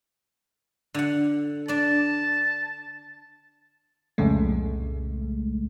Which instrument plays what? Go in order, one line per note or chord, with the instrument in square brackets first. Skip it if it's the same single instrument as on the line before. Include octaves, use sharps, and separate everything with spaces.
[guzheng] D3 F#5
[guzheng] D4 D5 [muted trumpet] A5
[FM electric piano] C2 F2 A#2 C#3 G#3 A3